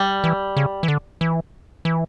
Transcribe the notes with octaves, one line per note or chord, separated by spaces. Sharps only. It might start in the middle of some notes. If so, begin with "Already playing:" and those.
Already playing: G3
E3
C#3
E3
D3
E3
E3